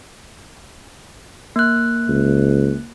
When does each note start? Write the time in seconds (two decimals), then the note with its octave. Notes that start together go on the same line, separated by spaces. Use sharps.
1.56 A#3 F#6
2.09 C#2